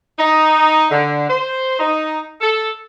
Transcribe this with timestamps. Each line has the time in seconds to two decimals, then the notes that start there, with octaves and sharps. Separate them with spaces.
0.18 D#4
0.91 D3
1.28 C5
1.80 D#4
2.41 A4